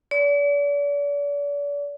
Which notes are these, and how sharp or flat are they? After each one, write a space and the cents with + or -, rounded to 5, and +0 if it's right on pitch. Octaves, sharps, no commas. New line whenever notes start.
D5 -40